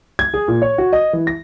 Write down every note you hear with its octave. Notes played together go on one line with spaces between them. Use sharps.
G#6
G#4
A#2
C#5
F#4
D#5
E3
A#6